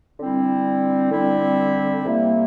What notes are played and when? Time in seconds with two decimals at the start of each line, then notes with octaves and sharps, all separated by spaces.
0.18 D3 G3 C4 E4
1.11 D3 G3 C4 E4
2.04 C3 G3 A#3 E4